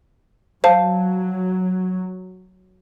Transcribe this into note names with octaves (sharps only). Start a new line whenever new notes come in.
F#3 C5 F5 A5